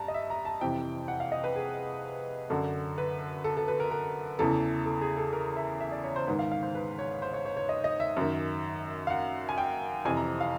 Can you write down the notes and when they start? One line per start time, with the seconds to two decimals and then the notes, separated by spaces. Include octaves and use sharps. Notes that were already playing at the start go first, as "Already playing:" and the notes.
Already playing: G2 A5 A#5
0.08 D#5
0.14 E5
0.30 A#5
0.45 A5
0.61 F2 C3 E3 G5
1.08 F#5
1.20 F5
1.32 D#5
1.44 B4
1.56 G#4
2.50 F#2 D3 A4
2.98 B4
3.44 A4
3.57 A4
3.68 B4
3.80 A#4
3.91 A#4
4.39 E2 C#3 E3 A4
4.86 A4
5.01 G#4
5.17 A4
5.33 A#4
5.57 E5
5.81 E5
5.92 D5
6.03 C#5
6.16 C5
6.27 G#2 D#3 B4
6.39 F5
6.51 F5
6.63 C5
6.75 B4
6.99 C#5
7.22 C5
7.34 C#5
7.45 C#5
7.57 C#5
7.69 D#5
7.84 D#5
8.00 E5
8.17 F#2 D#3
9.07 F5
9.10 F#5
9.49 G#5
9.58 G5
10.05 F2 C3 E3 G#5
10.17 A#5
10.40 F5